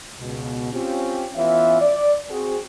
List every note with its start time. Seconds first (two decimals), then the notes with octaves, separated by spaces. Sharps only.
0.20 C#2 B2
0.73 C4 C#4 F4 G4
1.35 E3 B3 C#4 F4 C#5 E5
1.81 D5
2.29 C4 F#4 G#4